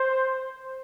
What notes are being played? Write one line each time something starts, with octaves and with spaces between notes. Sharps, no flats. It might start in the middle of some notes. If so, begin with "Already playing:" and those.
Already playing: C5